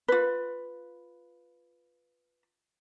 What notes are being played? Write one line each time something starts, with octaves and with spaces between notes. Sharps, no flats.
F4 B4